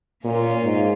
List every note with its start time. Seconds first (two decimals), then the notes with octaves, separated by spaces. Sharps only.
0.24 A#2 A#3 C#4 F4
0.64 G#2